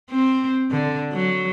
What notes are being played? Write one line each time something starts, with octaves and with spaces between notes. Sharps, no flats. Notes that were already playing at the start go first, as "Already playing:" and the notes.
C4
D3
F#3